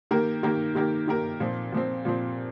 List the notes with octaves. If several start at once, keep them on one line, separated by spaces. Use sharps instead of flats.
D#3 A#3 G4 A#4
D#3 A#3 G4 A#4
D#3 A#3 G4 A#4
D#3 A#3 G4 A#4
A#2 F3 C4
A#2 F3 C4
A#2 F3 C4